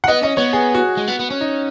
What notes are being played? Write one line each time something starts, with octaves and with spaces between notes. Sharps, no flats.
F#5
B3 D#5
C#4 D#5
B3 C#5
G#4
F#4
G#3
B3
B3
C#4
D#4